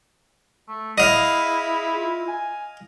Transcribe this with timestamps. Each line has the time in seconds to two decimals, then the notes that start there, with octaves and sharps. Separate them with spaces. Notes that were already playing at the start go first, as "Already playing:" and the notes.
0.68 A3
0.98 E4 G#4 D#5 F5
1.96 F4
2.28 G#5